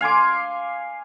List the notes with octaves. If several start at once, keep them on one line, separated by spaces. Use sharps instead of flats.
F5 G#5 C6 D6